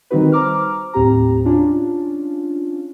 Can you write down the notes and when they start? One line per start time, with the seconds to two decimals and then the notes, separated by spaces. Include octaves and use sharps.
0.11 D#3 G3 C4 D#4 F#4 B4
0.32 C5 A#5 D6 F6
0.93 D#2 A2 C4 G4 A#5
1.45 C#4 D4 F4